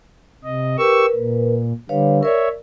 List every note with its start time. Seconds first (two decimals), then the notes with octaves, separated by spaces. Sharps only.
0.44 C3 D#5
0.78 G4 A#4 B4 C#6 E6
1.16 A#2
1.89 D3 G3 B4 C#5 F5
2.23 A#4 C#5 D5 E5